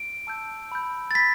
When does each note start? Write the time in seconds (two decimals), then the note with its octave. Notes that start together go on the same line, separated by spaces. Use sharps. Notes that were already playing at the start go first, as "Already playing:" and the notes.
Already playing: D7
0.27 A5 E6 G6
0.72 B5 E6 G6
1.11 A6
1.15 B5 G6 B6